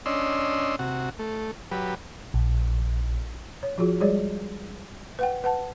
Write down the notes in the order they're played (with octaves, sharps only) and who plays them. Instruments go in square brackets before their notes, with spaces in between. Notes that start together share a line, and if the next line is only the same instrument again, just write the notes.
[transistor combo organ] C#4 D4 D#5 C6 E6
C3 F#4
A3
F#3 G4 B4
[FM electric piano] A#1
[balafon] C#5
F3 F4 F#4 G#4
G3 G#3 G#4 C#5 D5
B4 F#5 G5
B4 F#5 A5